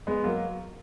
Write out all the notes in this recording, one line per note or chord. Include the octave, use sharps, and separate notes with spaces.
G#3 B3
F#3 A#3